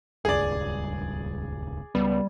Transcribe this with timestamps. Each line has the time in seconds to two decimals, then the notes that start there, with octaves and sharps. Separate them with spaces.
0.25 D#1 C#2 G2 G#4 D5
1.95 C#2 G3 B3